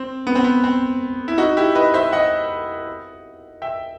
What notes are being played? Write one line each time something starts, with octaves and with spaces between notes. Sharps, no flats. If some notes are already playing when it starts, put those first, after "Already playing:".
Already playing: C4
B3
C4
B3
C4
E4
D#4 F#4
E4 G4
B4 D#5
C5 E5
D#5 F#5
E5 G5